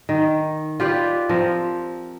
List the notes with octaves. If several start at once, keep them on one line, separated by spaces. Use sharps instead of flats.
D#3
F4 G4 B4 D5
F3 C4 A#4